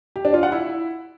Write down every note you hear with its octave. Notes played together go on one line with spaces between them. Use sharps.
G4
D4
F4
F#5
E4